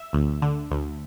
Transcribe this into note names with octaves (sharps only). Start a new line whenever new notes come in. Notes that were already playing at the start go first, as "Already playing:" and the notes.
Already playing: E5
D2
D3
D2